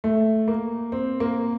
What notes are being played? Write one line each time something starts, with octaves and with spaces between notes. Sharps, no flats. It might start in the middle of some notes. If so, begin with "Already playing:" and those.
A3
A#3
C4
A#3